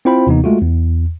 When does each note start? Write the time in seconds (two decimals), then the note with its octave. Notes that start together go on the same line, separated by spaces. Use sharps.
0.05 C4 E4 F4 C5 G5 B5
0.27 D#2 C3 E3 B3 D#4
0.44 G#3 A3 F4 F#4
0.62 E2